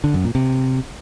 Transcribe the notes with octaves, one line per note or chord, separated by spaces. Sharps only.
D3
F#2
A#2
C3